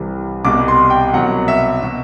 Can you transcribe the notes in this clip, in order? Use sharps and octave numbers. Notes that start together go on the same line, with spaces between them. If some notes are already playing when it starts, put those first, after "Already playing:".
Already playing: C2 C3 E3 G3
C2 B2 G3 D6
C6
G5
C2 B2 F#3 F#5
E5
B2